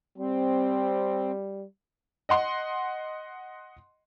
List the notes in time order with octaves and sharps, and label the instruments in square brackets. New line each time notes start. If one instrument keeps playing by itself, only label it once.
[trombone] G3 [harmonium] C4
[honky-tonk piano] D#5 F#5 C6